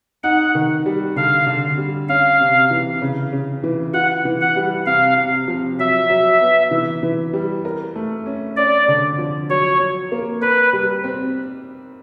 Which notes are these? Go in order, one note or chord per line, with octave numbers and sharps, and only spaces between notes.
D#4 F#5
D#3
G3
D3 F5
D3
G3
C#4 F5
C3
E3
C#3
C#3
E3
F4 F#5
E3
F#5
G3
C3 F5
C3
F3
F#3 E5
F#3
B3
E3
E3
G3
A#4
A3
C#4
C#4 D5
D3
F3
F#3 C#5
F#3
A#3
A#4 B4
G3
C4